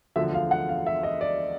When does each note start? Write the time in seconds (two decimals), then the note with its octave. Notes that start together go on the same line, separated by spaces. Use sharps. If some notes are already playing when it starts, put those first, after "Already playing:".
0.16 E1 D2 D3 F3 E5
0.34 F5
0.51 F#5
0.69 F5
0.87 E5
1.03 D#5
1.21 D5